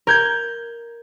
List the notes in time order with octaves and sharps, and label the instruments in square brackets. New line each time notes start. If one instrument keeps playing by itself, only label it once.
[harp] A#4 G6 G#6